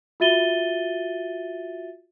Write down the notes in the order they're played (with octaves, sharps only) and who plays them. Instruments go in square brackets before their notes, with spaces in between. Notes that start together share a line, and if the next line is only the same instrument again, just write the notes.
[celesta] F4 F#4 E5 A6 D#7 G7